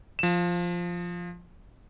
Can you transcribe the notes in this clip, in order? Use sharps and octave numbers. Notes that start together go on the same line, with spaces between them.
F3 E7